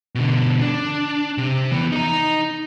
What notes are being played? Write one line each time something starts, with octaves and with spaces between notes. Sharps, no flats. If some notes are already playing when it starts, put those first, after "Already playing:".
B2 D3
D4
C3
E3 B3
D#4 A#5